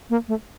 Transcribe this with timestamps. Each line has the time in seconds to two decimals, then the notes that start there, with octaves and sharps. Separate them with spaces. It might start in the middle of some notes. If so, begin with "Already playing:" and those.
0.10 A#3
0.28 A3